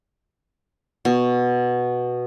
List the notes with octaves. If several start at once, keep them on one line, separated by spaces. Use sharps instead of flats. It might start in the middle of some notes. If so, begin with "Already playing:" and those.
B2